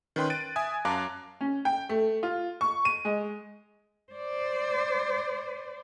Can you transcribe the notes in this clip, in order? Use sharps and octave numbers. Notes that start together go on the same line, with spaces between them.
D#3 C#4 B4 G5 C6 F#6
A6 D7 D#7
E5 G#5 D#6 G#6
F#2 F5 A5 A#5 D6 F#6
C#4
G5
A3
F4
C#6
D#7
G#3
C5 D5